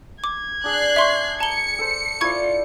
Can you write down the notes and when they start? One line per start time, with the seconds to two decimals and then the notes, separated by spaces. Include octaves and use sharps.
0.24 D6 G#6
0.64 D4 G#4 F#6 C7
0.96 E5 C6 C#6
1.40 A5 A#5 C#7 G7
1.79 A4 C5
2.21 E4 F4 C5 D5 C#6 G#6